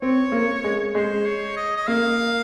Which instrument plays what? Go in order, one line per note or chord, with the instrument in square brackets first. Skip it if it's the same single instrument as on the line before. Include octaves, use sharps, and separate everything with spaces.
[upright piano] C4 [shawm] C#5
[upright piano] A#3
G#3
[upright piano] G#3 [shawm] C5
[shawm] C#5
D#5
D#5
[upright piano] A#3 [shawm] F5